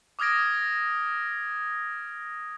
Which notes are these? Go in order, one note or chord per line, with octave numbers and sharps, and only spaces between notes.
D6 D#6 F6 G#6 A#6 D7